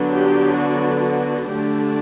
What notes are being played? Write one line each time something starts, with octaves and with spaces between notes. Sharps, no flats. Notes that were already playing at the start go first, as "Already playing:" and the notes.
Already playing: D3 F#3 B3 D4
G4
F#4
F#4
D3 A3 D4 G4